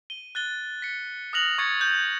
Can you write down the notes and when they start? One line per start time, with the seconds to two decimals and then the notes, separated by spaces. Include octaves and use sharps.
0.10 D#7 G7
0.35 F#6 A6 G7
0.82 B6 C#7
1.33 D#6 F6 F#6 A#6 F7 F#7
1.58 C#6 G#6 A6 C#7
1.81 G6